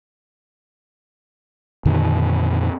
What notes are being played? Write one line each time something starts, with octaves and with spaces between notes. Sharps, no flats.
F2 A#2 D3 D#3